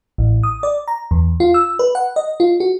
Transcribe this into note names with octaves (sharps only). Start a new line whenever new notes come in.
A1
D#6
D5
A#5
E2
F4
E6
B4
F#5
D#5
F4
F#4